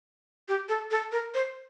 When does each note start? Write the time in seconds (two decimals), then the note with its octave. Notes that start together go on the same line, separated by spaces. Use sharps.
0.48 G4
0.69 A4
0.91 A4
1.12 A#4
1.34 C5